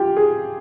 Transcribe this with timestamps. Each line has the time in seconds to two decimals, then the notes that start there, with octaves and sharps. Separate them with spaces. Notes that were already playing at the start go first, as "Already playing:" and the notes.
Already playing: F4 G4
0.17 G#4